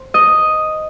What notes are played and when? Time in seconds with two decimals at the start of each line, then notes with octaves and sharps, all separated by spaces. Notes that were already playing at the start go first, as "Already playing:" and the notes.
Already playing: C5
0.14 D#5